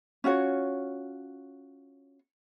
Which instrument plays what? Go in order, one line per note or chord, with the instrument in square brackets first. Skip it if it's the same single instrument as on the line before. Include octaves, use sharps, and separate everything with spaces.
[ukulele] C#4 F4 F#4 C#5